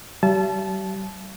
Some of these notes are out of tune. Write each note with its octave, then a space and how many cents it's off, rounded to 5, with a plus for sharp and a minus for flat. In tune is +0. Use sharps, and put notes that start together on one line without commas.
G3 -40 E5 +45 A5 -20